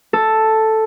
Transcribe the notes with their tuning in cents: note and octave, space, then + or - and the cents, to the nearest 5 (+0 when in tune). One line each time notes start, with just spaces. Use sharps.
A4 +0